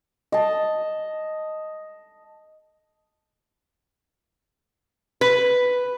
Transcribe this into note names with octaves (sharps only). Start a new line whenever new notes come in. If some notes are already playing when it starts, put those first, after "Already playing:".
D#5 A5
B4